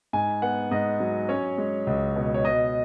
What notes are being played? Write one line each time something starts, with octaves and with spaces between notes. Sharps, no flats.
G#2 G#5
B3 F#5
G#2 D#5
F#3
C#4 C#5
G#3
C#2
B2
C#5
B2 D#5